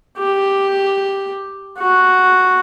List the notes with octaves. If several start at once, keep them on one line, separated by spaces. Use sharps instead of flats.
G4
F#4